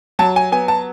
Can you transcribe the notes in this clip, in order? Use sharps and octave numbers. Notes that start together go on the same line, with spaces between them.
F#3 A5
G#5
B3 G#5
A5